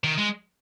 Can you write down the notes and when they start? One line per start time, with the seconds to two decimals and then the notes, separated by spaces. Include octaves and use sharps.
0.04 D#3
0.18 G#3